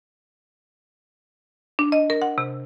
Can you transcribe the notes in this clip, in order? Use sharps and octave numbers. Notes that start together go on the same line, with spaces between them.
D4
D#5
A#4
F#5
C3